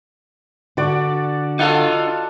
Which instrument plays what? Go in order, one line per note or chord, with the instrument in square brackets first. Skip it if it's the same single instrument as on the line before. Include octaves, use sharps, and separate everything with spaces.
[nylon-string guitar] D3 [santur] F#4 D5
[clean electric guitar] D#4 F4 F5 [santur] A4 F#5